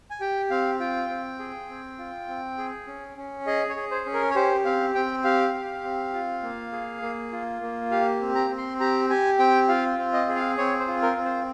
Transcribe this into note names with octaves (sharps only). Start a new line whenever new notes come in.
G#5
G4 G5
C4 F5
F4 G5
C4
G#4
C4
F4
C4
G#4
C#4
C#4
G#4 D#5
C#5
G#4
C5
C#4
A#4
C#5
G4 C5
C4 F5
C4 G5
G4 F5
G4
C4
F4
A#3
G#4
A#3
F4
A#3
G4 F5
C4
A#5
C4
C6
G4 A#5
G4 G#5
C4 G5
F4 F5
C4
D#5
G#4
F5
C4 C#5
C5
F4
A#4
C4
C5